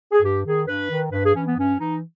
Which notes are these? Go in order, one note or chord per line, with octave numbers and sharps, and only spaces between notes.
G#4
G2 G4
D#3 G#4
G2 B4
D#3
G2 B4
G#4
E3 C#4
B3
G2 C#4
E3 D#4